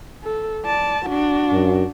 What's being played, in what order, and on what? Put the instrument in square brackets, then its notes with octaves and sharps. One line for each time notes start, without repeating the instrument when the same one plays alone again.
[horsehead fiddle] A4
D5 A5
D4 F#4
[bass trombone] F#2